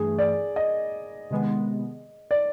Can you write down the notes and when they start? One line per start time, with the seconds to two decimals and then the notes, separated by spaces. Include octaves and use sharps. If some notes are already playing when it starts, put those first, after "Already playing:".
Already playing: G2 E3 A3 G#4
0.19 D5
0.56 D#5
1.30 C3 D#3 G#3 B3
2.31 D5